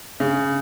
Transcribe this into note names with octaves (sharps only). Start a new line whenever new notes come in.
C#3